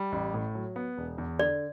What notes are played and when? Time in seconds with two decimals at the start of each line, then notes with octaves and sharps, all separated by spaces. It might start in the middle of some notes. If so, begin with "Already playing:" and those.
Already playing: G3
0.12 A1
0.34 A2
0.55 F#3
0.76 B3
0.98 E1
1.18 E2
1.39 D3 D5